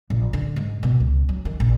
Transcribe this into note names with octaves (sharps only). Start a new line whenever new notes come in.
A#1
D3
G#2
B2
C#2
F#3
D#3
A#1